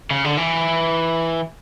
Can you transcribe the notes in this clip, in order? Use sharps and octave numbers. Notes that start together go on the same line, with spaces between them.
C#3
D3
E3